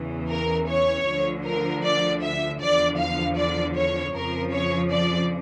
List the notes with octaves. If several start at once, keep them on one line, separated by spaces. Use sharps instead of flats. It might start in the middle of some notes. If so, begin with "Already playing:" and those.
Already playing: E2 C#3 E3
A#4
C#5
D2 D3 F3
A#4
D5
E5
E2 D3 F3 D5
F5
D5
C#5
F2 C#3 F3 A#4
C#5
D5